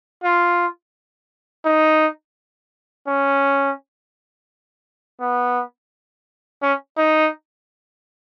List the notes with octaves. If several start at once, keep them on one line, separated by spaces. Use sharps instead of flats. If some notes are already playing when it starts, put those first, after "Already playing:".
F4
D#4
C#4
B3
C#4
D#4